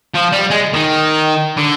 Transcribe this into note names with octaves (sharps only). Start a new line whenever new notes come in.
F3
G3
G#3
D#3
D3